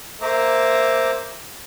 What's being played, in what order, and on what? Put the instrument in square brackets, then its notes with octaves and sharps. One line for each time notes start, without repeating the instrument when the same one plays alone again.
[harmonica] A#3 E5 [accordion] C5 A#5 D6